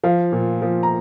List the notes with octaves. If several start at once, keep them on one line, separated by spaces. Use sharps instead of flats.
F3 F5
A#2
F3
A#5